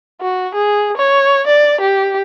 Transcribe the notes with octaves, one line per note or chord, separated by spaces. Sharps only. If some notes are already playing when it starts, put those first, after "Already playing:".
F#4
G#4
C#5
D5
G4